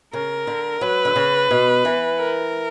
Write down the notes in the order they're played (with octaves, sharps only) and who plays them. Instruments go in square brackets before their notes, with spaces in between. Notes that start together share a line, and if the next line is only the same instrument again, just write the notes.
[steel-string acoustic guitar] C#3 [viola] A#4
[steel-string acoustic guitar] D3
[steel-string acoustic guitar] F#3 [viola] B4
[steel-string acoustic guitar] D3
C#3
B2
E3
[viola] A#4